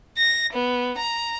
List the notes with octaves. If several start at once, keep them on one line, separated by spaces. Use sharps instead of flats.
A#6
B3
A#5